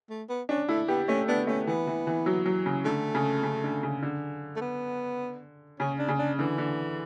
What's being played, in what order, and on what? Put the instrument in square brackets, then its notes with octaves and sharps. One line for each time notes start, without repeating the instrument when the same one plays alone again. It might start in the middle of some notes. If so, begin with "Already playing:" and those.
[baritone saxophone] A3
B3
[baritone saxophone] C#4 [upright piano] D4
[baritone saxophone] A3 [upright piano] E4
[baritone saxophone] B3 [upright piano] G4
[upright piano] A3 [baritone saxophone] C#4
[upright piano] B3 [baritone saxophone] D4
[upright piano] A3 [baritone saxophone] C#4
[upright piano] E3 [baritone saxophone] B3
[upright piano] E3
E3
F#3
F#3
C#3
[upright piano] D3 [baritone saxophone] A3
[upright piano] C#3
C#3
D3
C#3
D3
[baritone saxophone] A3
B3
[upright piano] C#3 [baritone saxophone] C#4
[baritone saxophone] D4
[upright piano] C#3
[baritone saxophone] D4
[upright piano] D3 [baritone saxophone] E3
[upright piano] D3